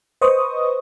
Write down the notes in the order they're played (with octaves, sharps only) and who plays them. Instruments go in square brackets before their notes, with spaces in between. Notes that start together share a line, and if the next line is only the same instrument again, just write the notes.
[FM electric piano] B4 C5 D#5 C#6 D#6